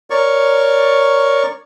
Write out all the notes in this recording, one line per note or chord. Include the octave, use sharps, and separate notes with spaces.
A#4 C#5 D5 C#6